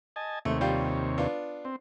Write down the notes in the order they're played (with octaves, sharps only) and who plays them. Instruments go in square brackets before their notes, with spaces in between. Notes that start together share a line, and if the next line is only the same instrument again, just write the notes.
[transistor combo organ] D#5 G#5 A5
[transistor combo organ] D#2 C3 C#5 [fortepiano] A3
[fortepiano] G3 F4 G4
B3 D4 F4
[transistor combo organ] C4